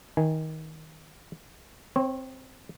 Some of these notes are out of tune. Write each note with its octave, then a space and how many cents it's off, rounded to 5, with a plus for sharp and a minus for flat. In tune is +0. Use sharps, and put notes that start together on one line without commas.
D#3 +20 G#5 +0
C4 +0 C#5 -30